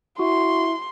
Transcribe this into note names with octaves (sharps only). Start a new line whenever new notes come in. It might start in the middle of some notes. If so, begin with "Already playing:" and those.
E4 F#4 C6